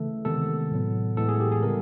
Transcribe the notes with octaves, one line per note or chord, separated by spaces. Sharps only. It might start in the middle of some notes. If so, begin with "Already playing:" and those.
Already playing: C#3 E3 A3 A4
C3 D#3 G#3 B3 A4
A2 F#3 B3
A2 E3 G#3 B3 A4
G#4
G4
G#4
C#3 E3 G3 B3 A#4